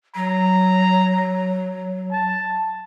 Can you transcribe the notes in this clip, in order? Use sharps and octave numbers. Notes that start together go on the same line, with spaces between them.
F#3 A#5
A5